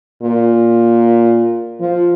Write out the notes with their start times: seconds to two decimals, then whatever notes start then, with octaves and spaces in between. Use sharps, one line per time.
0.22 A#2
1.80 F3